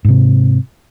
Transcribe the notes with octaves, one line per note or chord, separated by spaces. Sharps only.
G#2 C3